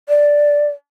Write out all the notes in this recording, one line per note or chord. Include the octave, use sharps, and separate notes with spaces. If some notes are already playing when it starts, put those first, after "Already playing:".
D5